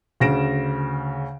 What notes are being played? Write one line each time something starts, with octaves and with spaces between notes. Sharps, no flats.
D2 C#3 A#6 D7 E7